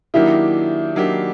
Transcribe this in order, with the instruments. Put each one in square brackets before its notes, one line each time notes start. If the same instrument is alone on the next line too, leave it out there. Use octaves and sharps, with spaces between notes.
[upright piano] D#3 F#3 A#3 D4 G4 [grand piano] E4
[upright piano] D#3 F#3 A#3 D4 G4